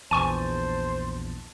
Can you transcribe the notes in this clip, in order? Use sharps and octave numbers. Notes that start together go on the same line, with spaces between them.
A#1 E2 C5 G#5 A5 C#6 D#7